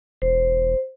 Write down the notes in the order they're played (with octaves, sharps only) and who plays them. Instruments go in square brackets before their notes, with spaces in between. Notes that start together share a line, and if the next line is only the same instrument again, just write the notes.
[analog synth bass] E1 [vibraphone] C5